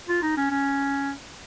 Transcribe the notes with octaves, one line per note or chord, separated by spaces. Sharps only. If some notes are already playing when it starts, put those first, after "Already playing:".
F4
D#4
C#4
C#4